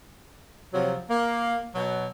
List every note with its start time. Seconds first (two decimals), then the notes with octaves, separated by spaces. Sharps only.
0.73 C3 F3 F#3
1.09 A#3
1.75 B2 F#3